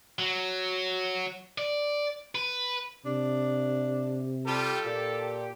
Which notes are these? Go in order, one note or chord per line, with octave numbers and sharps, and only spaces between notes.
F#3
D5
B4
C3 D4
G3 F4 G4 A4
A#2 G4